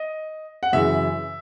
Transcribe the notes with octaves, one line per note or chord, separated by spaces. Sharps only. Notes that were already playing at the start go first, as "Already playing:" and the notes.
Already playing: D#5
F#5
F#2 C#3 E3 E5